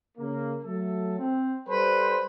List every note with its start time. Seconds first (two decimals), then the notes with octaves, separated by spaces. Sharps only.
0.18 C#3 A#3
0.64 F#3 A3 A4
1.19 C4
1.69 G3 A4 B4 C5